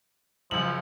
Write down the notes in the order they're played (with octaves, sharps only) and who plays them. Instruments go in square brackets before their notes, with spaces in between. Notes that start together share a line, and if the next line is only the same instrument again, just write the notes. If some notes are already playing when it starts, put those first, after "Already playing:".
[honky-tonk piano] C#2 F#2 F#7 [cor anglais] F3